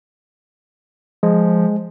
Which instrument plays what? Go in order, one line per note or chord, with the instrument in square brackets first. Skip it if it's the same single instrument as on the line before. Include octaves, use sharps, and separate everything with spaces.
[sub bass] F3 [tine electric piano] G#3